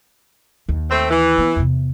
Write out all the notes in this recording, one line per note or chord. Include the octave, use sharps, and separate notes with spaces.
D#2
A3 C4
E3
B3
E2 C3